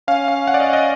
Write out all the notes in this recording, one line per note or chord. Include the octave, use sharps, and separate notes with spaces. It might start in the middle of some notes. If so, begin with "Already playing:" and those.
C#4 F5
F5
F#5
D5
D#5
D#5